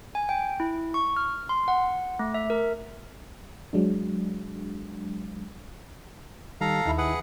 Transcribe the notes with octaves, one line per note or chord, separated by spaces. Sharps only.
G#5
G5
E4
C#6
F6
C6
F#5
A3
E5
A#4
F#3 G#3 D4
D#3 G3 A4 F5 A#5
D#2 D#3 E4 E5 B5
G#4 B4 F#5